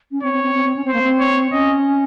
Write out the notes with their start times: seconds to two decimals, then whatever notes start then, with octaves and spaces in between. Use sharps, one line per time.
0.12 C#4
0.22 C4 C#5
0.33 C4
0.44 C4
0.55 C4
0.65 C4
0.76 C#4
0.85 C4 C5
0.94 A#3
1.03 C4
1.19 C#5
1.52 C#4 D#5